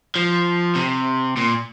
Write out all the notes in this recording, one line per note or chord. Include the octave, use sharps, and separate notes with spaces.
F3
C3
A#2